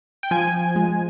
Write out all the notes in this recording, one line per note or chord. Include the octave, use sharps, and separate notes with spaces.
G5
F3 G#5
G#3